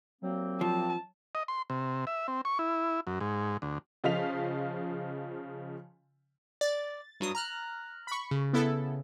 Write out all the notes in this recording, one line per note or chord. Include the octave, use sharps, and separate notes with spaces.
C2 F#3 A#3 C4
F3 A5
D#5
C6
C3
E5
C4
C#6
E4
F#2
G#2
D2
C#3 F3 D#5 F5 B6 F7
D5 A6
G2 F#3 D#6
A#5 F6 F#6
B5 C#6
C#3
B3 E4 A4